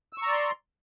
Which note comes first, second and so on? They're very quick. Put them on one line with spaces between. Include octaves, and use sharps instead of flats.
E6 C#6 A#5 D5 C6